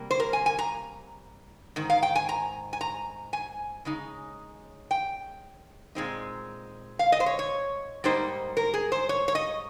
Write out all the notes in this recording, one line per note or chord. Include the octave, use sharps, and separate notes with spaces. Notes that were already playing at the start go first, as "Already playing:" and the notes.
Already playing: C3 G3 A#3
C5
A#4
G#5
G#5
A#5
G#2 D#3
F5
G5
G#5
A#5
G#5
A#5
G#5
C#3 G#3 D#4
G5
A#2 G#3 C4 D#4
F5
D#5
C5
C#5
C#5
G#2 G3 A#3 D#4 C5
A#4
G#4
C5
C#5
C#5
D#5